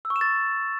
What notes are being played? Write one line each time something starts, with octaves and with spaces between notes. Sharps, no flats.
E6
C#6
E7
A6